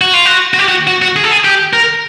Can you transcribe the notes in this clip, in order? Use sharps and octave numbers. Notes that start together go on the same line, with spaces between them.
F#4
F4
F#4
F#4
G4
F#4
F#4
F#4
G#4
A4
G#4
G4
A#4